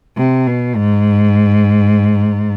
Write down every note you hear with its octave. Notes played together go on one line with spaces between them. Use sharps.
C3
B2
G#2